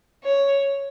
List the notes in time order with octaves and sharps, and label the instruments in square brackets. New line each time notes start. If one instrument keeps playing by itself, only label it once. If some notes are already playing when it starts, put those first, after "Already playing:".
[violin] C#5